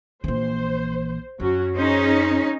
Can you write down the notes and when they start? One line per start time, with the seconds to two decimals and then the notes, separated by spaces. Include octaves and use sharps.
0.24 A#1 E3 C5
1.40 F#2 F#3 C#4 F#4
1.76 C#4 D#4 G#4 C5